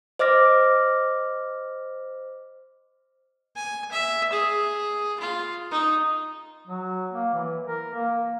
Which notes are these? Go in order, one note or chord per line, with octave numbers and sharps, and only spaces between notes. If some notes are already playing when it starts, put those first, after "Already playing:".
C5 D#5 D6 F6 A#6
G#5
E5
G#4
F4
D#4
F#3
A#3
E3
A#4
A#3